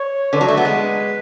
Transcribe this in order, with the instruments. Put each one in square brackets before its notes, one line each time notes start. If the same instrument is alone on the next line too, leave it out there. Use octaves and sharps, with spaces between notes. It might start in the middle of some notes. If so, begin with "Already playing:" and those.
Already playing: [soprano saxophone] C#5
[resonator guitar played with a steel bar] D3 [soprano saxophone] B4
[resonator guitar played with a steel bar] F#3
A3
B3
G#3